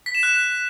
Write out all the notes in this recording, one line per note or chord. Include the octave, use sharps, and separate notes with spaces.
B6
E7
F#6